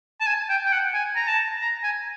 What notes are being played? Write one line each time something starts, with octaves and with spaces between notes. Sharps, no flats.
A5
G#5
G5
G5
F#5
G#5
A#5
A5
A#5
G#5